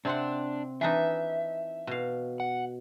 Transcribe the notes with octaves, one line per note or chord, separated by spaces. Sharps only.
C3 C4 D4 F#5
E3 D4 D#4 E5
B2 F5
F#5